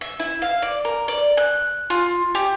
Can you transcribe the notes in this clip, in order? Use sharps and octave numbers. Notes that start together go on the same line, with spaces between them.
E5
E4
F5
D5
A#4
D5
F#6
F4
G4